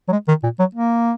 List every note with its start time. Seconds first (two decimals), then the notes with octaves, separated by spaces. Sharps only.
0.08 F#3
0.12 G#3
0.28 D#3
0.44 A#2
0.59 F#3
0.75 A#3